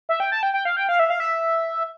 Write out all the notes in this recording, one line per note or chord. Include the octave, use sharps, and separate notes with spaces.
E5
G5
A5
G5
G5
F5
G5
F5
E5
F5
E5